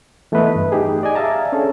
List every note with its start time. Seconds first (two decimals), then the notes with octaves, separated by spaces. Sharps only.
0.32 E3 A3 B3 E4 B4 D#5
0.56 G2
0.72 D#4 G4 G#4
1.03 D5 D#5 G#5
1.15 D5 E5 F5 A5 A#5
1.52 C#4 D4 G#4 A4